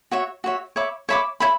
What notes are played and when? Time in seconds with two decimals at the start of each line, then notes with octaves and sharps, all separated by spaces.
0.11 F#4 C#5 E5
0.44 F#4 C#5 E5
0.76 C#5 E5 B5 D6
1.09 C#5 E5 B5 D6
1.40 C#5 E5 B5